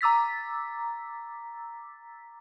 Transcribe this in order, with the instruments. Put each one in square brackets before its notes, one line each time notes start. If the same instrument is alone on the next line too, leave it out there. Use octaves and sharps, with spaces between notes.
[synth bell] A#5 D6 E6 A6 B6